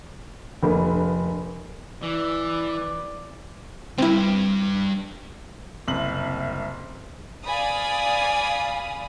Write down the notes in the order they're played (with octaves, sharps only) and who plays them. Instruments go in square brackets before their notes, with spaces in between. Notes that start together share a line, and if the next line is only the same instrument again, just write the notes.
[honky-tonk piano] F1 D3 A#3 B4
[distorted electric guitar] E3 [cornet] D5
[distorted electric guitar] C2 G2 [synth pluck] C4 E4
[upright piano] F#1 C2 F#7
[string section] D5 F5 G#5 B5 D#6